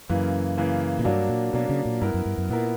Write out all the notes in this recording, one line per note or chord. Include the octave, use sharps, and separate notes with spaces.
F#2 C#3 E3 A#3
C#3 E3 A#3
A#2
G2 F#3 A#3 D4
A#2
B2 F#3 A#3 D4
C#3
A#2
G2 B3 E4 A#4
F#2
G2
F#2
A#2 B3 E4 A#4